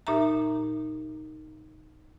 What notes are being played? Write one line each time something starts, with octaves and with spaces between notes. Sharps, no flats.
A#2 D#4 G4 E5 A#5